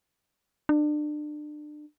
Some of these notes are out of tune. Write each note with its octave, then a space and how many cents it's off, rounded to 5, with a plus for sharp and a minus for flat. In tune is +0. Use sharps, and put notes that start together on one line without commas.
D4 +30